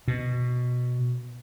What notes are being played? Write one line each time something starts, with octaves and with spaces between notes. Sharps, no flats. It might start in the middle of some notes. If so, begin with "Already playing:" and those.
B2